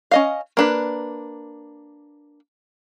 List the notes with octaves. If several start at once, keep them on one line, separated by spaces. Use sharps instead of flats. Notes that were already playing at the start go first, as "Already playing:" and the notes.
C#4 D#5 F5
A#3 D4 B4